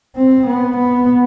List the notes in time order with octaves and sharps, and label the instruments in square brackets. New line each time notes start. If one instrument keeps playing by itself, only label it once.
[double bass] C4
B3
B3